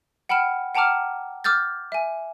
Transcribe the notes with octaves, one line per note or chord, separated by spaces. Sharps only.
F#5 G5 B5 F6 E7
F#5 G5 A5 A#5 D6 F6
D6 E6 F6 G6 A6
E5 G#5